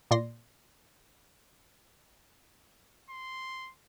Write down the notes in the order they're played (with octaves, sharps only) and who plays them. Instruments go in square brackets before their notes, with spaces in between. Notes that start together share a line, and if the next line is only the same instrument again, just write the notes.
[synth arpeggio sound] A#2 D5 C6 A#6
[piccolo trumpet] C6